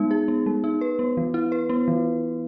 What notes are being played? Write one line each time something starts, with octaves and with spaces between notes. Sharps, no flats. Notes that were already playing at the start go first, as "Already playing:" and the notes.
Already playing: G#3 B3 D#4
G#4
B3
G#3
D#4
B4
B3
E3
E4
B4
B3
E3